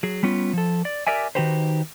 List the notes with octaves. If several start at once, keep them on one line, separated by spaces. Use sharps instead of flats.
F#3 G#4
G3 B3 C#4 F4
F3 A4
D5
G4 A#4 D5 E5 G#5
D#3 D#4 F#4 G4 B4 C5